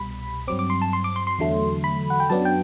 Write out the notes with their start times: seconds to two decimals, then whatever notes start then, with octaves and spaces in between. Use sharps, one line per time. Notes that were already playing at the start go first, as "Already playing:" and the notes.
Already playing: C2 B2 G3 B5
0.48 G2 F#3 C4 D6
0.59 D6
0.70 C6
0.82 A5
0.93 C6
1.04 D6
1.16 C6
1.27 C6
1.39 E2 D3 F#3 A3
1.84 B5
2.10 F#5
2.20 G5
2.30 F#2 F#3 B3 D4 A5
2.45 G5